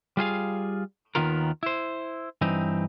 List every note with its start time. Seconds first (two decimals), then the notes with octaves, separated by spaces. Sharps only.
0.17 G3 F4 G#4 F5
1.15 D#2 B2 D#3 B3 F4 A#4
1.63 E4 C5
2.41 G2 E3 C4 D#4